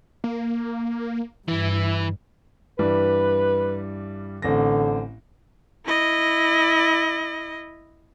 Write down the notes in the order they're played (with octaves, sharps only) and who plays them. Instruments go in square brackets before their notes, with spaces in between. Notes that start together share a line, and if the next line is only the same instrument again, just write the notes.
[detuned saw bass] A#3
[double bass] G2 [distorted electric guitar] E3 [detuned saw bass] E4
[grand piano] G2 E3 G3 [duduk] B4
[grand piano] A1 C4 A#6 [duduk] D3
[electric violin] E4 D#5